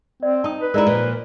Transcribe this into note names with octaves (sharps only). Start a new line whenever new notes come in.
C4 D5
D#4 A5 D#6
B4
G#3 D#4 E4 A#4 D5 A#5
A#2 F3 B4